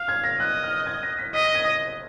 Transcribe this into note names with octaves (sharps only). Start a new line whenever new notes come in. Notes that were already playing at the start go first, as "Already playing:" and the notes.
Already playing: F5 F6
G#6
A#6
D#5 F#6
F6
G#6
A#6
B6
D#5 B6
A#6
G#6
A#6